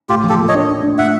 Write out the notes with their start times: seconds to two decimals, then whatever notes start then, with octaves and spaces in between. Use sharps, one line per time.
0.09 A2 F4 G4
0.24 F3
0.29 G4 A4
0.39 A#3
0.48 C#5 D#5
0.54 D4
0.68 D4
0.83 D4
0.98 A2 E5 F#5